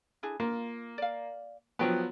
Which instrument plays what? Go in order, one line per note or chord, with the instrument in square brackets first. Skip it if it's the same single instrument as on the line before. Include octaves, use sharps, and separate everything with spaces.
[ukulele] D4 E4 G#4
[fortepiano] A#3 [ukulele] F4
[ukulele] D5 F5
[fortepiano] F3 F#3 B3 [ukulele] G5 A5